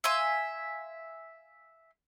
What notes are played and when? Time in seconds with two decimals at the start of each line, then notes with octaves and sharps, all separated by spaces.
0.04 E5 F5 G#5 C6